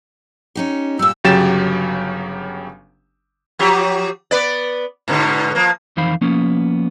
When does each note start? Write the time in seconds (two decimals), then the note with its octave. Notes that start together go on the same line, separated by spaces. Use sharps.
0.55 C#4 D#4 G4
0.99 A#2 G3 E6
1.24 G1 C#3 F#3 G4 A6 E7
3.59 F3 F#3 G4
4.31 B3 B4 D5
5.08 G#2 B2 D3
5.55 F3 A#3
5.97 F2 D#3 E3 C5 F5 B5
6.21 F3 A#3 B3 C#4